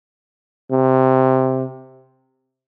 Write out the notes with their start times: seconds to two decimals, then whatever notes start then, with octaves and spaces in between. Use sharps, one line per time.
0.71 C3